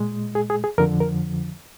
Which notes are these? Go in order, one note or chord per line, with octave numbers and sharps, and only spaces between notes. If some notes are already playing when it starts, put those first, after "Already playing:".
Already playing: A#2 G#3
G#4
G#4
G#4
F2 D3 F3 A#4
A#4